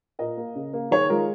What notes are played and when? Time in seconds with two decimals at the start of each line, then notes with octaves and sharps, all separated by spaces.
0.19 A#2 A#4 D#5
0.37 A#3
0.55 C#3
0.73 A#3
0.91 D#3 G#4 C#5
1.10 G#3 F4 A#4